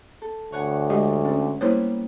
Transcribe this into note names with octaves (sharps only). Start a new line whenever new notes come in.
A4
D2 C#5 F#5 G#5
G#3 G4 D#5
C#4
G3 A#3 B3 E4 C5 C#5